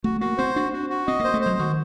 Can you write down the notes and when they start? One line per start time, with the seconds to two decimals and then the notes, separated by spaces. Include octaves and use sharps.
0.04 A3 F#4
0.21 A#3 F#4
0.38 C4 C5
0.56 D4 F#4
0.73 F#4
0.90 F#4
1.07 C4 D#5
1.20 A#3 C5
1.34 A3
1.42 F#3 C5
1.59 D#3 F#4